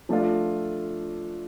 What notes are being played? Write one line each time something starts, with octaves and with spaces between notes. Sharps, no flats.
F3 A3 D4 F4